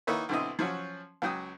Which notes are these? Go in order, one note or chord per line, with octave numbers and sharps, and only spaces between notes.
D#3 A#3 D#4 E4 B4 C#5
B1 D3 C4 E4 D#5
F3 F#3 C#4 F#4
C#2 F#3 G5 D#6